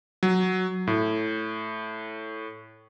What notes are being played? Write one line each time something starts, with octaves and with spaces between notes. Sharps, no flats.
F#3
A2